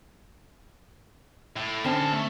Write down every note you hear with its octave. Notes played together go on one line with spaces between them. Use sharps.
A2
D3 C4 C#4 A#4 A5
A3